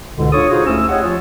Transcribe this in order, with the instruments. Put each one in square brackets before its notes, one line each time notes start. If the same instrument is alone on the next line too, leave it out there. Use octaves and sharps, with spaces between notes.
[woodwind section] C#2 G#2 B2 D3
D4 F4 A4 C#5 C#6 D#6
D#4 F4 F#4 G#4 C5 C#5
D2 A3 C#4 E4 E6
G4 G#4 C#5 D#5 F#5
F3 F4 C#5